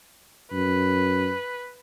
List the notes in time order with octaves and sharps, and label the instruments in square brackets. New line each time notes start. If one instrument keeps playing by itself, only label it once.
[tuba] F#2 [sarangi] B4